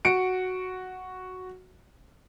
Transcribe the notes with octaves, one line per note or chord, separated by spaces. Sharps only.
F#4 C#7 D7